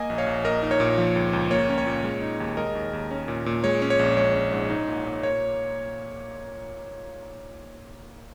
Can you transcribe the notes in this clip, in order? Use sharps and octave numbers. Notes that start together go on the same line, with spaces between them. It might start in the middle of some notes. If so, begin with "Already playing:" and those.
Already playing: A#3 D#5 G#5
A#1
C#5 F5
A#1
A#3 A#4 D#5
D#4
C#5
A#2
F3
C#2
C#2
A#3 C#5
C#4
C#5
A#2
G#3
D#4
D#2
G#3 A#4 D#5
D#2
D#2
C#4
A#2
A#2
G#3 C#5
C#4
C#5
A#1
G#3 C#5
C#4
G#2
D#4
A#2
A#2
A#3 C#5